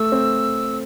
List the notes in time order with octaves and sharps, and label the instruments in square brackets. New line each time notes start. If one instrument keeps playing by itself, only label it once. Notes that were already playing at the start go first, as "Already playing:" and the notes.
Already playing: [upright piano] A3 [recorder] E6
[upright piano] C4